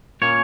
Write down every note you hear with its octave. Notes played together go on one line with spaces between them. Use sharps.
A#2 A#3 C#4 C#5